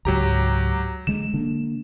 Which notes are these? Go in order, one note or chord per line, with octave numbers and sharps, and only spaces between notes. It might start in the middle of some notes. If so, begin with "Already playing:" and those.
C#2 G#2 F#3 G4 A#5
D3 G#3 E7
D3 A#3 D4